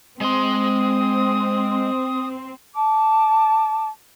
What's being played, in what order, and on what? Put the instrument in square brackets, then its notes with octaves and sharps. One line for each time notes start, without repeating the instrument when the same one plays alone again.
[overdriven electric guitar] G#3 C6 [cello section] C4 [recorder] D#6
[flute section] A5 D6